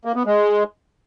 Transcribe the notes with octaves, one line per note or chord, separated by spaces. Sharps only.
A#3
B3
G#3